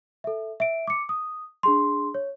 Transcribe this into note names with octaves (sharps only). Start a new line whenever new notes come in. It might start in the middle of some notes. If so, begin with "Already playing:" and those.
A4 E5
E5 D7
D6 C#7
D#6
D4 G#4 C6
C#5